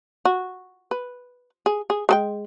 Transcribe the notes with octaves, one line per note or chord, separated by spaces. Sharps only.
F#4
B4
G#4
G#4
G#3 A4 G5